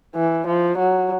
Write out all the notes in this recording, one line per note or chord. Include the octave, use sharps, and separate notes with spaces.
E3
F3
F#3